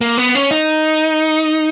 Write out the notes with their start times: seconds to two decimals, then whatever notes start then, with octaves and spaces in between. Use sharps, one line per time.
0.01 A#3
0.18 B3
0.35 C#4
0.51 D#4